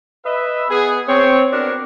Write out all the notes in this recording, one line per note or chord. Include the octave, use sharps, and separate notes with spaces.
B4 D#5 E5
B3 G#4
C4 C#5
B3 C4 D4 F#4 A#4